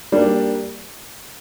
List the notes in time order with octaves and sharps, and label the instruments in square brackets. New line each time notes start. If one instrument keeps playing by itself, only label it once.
[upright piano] G3 A#3 D4